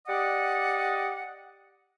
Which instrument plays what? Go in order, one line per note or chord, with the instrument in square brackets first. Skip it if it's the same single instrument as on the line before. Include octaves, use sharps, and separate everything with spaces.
[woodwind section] G4 D5 D#5 F#5